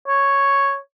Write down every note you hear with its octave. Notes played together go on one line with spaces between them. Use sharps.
C#5